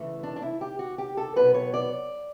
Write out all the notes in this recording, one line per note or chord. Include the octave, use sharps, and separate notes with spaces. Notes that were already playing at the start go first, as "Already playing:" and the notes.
Already playing: E2 C#3 E3 A3
D4
D4
E4
G4
F#4
G4
A4
B2 F#3 B3 B4
C#5
D5